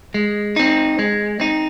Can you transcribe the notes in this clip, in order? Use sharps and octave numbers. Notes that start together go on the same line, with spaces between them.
G#3
C4 D#4
G#3
C4 D#4